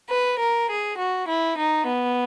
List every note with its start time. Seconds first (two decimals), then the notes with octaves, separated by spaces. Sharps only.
0.11 B4
0.41 A#4
0.70 G#4
0.99 F#4
1.29 E4
1.59 D#4
1.88 B3